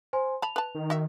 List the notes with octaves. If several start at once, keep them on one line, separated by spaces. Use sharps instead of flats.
C5 G#5 C6
A5 B5 F7
B4 A5
D#3
F#4 E5